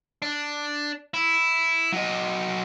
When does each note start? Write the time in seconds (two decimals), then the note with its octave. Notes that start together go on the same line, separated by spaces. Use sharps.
0.22 D4
1.14 E4
1.92 F#3 D#5